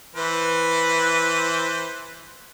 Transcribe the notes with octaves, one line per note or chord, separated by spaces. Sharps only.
E3 B4 C5